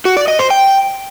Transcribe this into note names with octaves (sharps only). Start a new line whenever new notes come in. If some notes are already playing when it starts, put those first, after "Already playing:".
F#4
D5
D#5
C5
G5